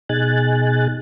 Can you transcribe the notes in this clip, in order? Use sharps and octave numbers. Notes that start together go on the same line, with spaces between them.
B2 D#4 G#4 G#5 F#6 A6